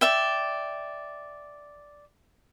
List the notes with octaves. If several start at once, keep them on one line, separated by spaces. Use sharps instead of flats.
D5 E5 G5